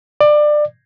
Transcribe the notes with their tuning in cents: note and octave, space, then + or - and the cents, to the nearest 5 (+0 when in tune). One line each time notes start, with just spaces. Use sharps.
D5 +20